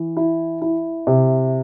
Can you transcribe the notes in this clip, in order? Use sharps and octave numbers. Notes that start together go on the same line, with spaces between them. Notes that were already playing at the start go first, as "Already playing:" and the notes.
Already playing: E3
E4
E4
C3